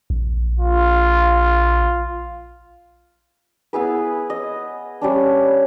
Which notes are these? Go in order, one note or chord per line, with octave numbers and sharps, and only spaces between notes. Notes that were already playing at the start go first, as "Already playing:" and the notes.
A#1
F4
B3 E4 G#4 B4
D#5
G3 C#4 D4